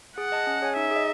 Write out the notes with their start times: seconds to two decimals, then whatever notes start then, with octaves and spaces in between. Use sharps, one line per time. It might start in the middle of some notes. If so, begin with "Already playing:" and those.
0.17 G#4 F#5
0.32 D#5 A5
0.47 C#4
0.62 G#4 C#5 G#5
0.76 D#4 E5
0.91 G#4
0.96 D#5